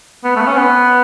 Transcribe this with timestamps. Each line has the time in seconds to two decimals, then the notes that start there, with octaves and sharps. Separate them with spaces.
0.24 B3
0.36 A3
0.41 B3
0.47 C#4
0.57 B3